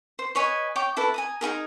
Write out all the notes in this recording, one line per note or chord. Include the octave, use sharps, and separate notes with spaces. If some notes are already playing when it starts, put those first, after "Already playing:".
C5
B4 C#5 D#5 G#5
C#5 G5 D6
E4 A4 B4
G#5 A#5 D#6
D#4 E4 G#4 A#4